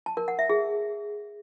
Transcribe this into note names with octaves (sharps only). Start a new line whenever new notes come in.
A5
A#4
F#5
E5
G#4